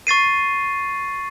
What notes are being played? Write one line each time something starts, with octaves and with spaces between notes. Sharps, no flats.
C#6 A6 C7 D#7